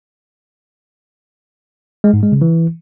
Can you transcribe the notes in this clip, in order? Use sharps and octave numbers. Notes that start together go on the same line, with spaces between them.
G#3
G#2
G#3
C#3
E3